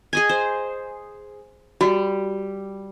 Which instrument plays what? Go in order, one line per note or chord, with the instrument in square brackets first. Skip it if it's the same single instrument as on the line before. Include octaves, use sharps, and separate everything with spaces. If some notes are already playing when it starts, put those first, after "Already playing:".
[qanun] G#4 D#5 G#5
C5
[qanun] G3 [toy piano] F#4